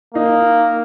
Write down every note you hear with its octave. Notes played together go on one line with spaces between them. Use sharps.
A#3 D#4